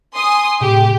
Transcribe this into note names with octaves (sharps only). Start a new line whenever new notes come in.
G#5 C6 D#6
A2 C3 G4 G#4